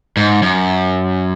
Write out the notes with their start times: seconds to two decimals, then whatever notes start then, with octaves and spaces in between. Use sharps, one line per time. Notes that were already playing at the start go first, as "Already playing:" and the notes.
0.17 G#2
0.42 F#2